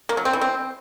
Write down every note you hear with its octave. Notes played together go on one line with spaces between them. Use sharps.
A#3
F#3
C4
E3
C4